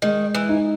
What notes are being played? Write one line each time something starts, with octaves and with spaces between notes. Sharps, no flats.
D#3 G#3
E3
D#4